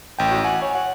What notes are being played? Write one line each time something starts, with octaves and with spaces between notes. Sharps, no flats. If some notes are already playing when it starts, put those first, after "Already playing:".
A1 G5
F#4
F#5 G#5
C#5
F#5